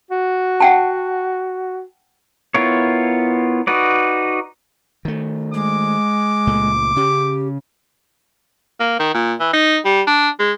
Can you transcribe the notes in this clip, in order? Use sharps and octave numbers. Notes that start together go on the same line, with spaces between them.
F#4
F#5 G5 A5
B3 E4 F4 A#4 C#5
D#4 F#4 B4 D5
D#3 A3
G#3 D6
C#2 A#2 A3
C#3 C#4 G4
A#3
D#3
A#2
E3
D#4
G3
D4
G#3